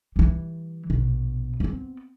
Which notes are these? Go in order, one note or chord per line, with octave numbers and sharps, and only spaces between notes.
E3 G3
A#1 B2
B3 C4